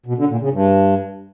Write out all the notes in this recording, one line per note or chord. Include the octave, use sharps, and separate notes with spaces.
B2
D3
A#2
C#3
G2